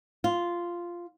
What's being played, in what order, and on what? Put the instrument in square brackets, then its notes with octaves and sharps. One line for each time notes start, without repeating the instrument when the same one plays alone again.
[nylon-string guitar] F4